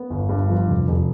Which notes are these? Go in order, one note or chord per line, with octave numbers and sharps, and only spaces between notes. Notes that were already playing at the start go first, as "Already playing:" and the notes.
Already playing: B3
G1
G2
F3
F1
F1